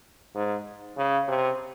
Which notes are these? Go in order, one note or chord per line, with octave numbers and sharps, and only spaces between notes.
G#2
C#3
C3